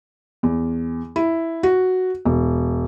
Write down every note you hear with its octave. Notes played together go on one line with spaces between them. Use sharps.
E2
E4
F#4
E1